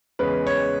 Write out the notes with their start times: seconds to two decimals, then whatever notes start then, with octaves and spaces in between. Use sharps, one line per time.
0.19 E2 C#3 G#3 C#4 B4
0.47 C#5